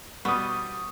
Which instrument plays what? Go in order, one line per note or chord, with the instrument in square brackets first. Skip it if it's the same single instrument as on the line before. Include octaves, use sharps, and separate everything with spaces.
[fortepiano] B2 G3 [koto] B3 [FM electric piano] C#6 D#6